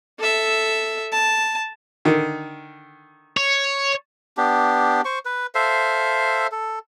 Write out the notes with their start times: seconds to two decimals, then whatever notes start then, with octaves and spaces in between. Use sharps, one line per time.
0.19 A4 E5
1.12 A5
2.05 D3 D#3
3.37 C#5
4.37 B3 D4 G4
5.05 C5 C#6
5.25 B4
5.55 A4 C5 E5 F5
6.52 A4